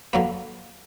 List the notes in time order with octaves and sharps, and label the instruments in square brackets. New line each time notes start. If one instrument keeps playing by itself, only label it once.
[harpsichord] D3 F#3 A#3 B4